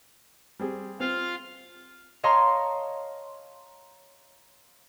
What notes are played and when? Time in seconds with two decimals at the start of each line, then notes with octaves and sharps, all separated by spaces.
0.59 G3 C4 G#4
1.00 C4 F4 F5
2.23 C#5 D#5 F5 A5 A#5 C6